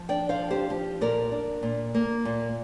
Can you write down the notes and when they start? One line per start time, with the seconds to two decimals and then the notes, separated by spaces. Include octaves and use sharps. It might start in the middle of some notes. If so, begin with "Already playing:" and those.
Already playing: F3
0.09 D4 D5 G5
0.29 C5 F5
0.40 F3
0.50 G4 C5
0.70 F3 G4
1.01 A#2 A#4 D5
1.32 D4
1.63 A#2
1.95 A#3
2.25 A#2